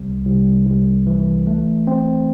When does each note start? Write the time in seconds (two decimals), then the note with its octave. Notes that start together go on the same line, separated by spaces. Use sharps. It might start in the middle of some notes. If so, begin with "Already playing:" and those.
Already playing: C2
0.26 C2
0.67 C2
1.07 E3
1.47 A3
1.87 C4